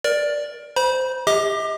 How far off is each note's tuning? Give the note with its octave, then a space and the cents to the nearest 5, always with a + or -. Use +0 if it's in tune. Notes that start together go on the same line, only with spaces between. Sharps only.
A#4 +25 D5 +0
C5 -15 B5 -35
G4 +30 D#5 +35 D6 +30